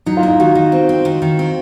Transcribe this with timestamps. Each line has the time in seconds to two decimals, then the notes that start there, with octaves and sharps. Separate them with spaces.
0.06 F#3 D#4
0.17 F4
0.23 A#3
0.28 D#4
0.40 D#3 F#4
0.55 D#3
0.72 C4
0.89 C4
1.05 D#3
1.22 D#3
1.39 C4